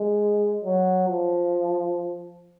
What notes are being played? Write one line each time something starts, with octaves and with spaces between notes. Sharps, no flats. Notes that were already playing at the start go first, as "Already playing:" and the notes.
Already playing: G#3
F#3
F3